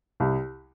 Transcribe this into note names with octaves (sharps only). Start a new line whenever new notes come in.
C2